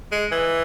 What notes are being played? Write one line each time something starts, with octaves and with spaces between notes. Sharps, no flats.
G#3
E3